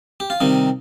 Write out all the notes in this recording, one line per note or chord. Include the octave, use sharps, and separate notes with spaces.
G4
F4
C3 D#3 G3 D#4